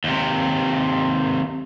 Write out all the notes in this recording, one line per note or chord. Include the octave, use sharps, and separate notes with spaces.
D#2 C3